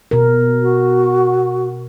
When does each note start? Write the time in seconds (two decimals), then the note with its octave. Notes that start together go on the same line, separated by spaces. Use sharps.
0.11 B2 A#4
0.62 F#4